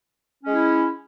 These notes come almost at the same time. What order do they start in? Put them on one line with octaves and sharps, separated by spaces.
C#4 G#3 E4